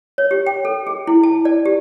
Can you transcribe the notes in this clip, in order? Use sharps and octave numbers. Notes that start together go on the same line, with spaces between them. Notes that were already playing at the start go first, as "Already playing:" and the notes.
C#5
G4
G5
A4
G#4
E4
A5
D5
G4